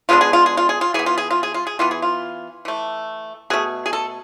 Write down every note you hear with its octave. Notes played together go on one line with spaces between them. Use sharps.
D3 G#3 B3 F4
G#4
F4
G#4
F4
G#4
F4
E3 B3 G#4
F4
G#4
F4
G#4
F4
G#4
E3 B3 F4
G#4
F4
E3 A3
B2 A3 G#4
G#4
A4